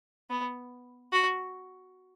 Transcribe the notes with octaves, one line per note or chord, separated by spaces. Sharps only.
B3
F#4